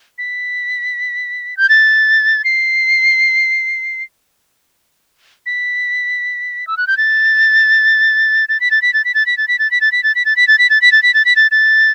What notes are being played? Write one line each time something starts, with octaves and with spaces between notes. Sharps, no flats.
B6
G6
A6
C7
B6
E6
F#6
G6
A6
A6
B6
A6
B6
A6
B6
A6
B6
A6
B6
A6
B6
A6
B6
A6
B6
A6
B6
A6
B6
A6
B6
A6
B6
A6
B6
A6
A6